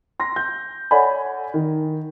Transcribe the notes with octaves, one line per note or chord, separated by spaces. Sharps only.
C6 A#6
G6
A4 C#5 D5 F#5 G#5 B5
D#3